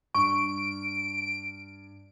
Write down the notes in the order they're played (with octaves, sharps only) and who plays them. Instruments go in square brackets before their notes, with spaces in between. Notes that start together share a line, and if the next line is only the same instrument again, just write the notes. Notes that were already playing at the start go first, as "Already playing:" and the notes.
[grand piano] G2 [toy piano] C#6 [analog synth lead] D7